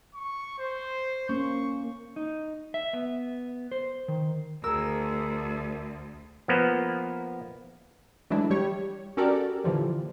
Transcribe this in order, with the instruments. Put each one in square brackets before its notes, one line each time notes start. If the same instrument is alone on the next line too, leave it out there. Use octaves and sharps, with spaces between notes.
[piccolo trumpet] C#6
C5
[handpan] A#3 C#4 [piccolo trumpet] C#6
[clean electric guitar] D#4
E5
B3
C5
D#3
[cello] D2 [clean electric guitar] G#4 A#4 [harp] E6
[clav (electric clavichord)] F3 A#3 B3
[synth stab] E3 F#3 G#3 A3 D4 E4
G3 G4 C#5
C#4 F#4 G4 A4 A#4 D5
A#2 D3 E3 F3 G3